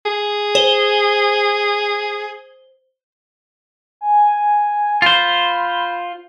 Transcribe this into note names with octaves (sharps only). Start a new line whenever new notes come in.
G#4
C5 G7
G#5
F4 C5 B5